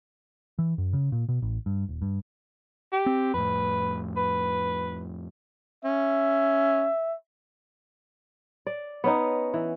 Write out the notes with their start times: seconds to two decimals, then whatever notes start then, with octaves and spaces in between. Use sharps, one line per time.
0.59 E3
0.78 F#2
0.93 C#3
1.12 A#2
1.29 B2
1.42 A1
1.66 G2
1.89 D#1
2.02 G2
2.92 G4
3.06 C4
3.34 F2 A2 B4
4.17 B4
5.85 C#4 E5
8.67 D5
9.04 B3 C#4 D#4
9.54 E3